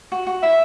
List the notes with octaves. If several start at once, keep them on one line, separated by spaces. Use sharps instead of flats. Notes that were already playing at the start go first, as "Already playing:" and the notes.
F#4
F#4
E4 E5